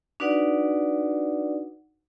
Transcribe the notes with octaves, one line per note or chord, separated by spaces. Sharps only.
D4 D#4 F#4 B4 D5 F#5